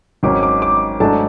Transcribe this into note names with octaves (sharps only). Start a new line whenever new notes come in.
G#1 G#2 F#3 C#4 D6
D6
D6
G#2 F#3 A3 D4 A5